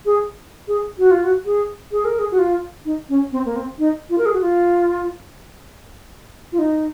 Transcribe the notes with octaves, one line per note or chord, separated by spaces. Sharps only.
G#4
G#4
F#4
F4
F#4
G#4
G#4
A#4
G#4
F#4
F4
D#4
C#4
C4
A#3
C4
D#4
F4
A#4
G#4
F#4
F4
F4
D#4